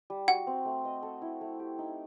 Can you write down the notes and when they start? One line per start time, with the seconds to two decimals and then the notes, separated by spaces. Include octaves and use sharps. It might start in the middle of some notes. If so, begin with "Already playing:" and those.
0.10 G3
0.27 F#4 F#5
0.47 C4
0.65 A3
0.85 D#5
1.03 A4
1.22 E4
1.41 A3
1.59 G4
1.79 D#4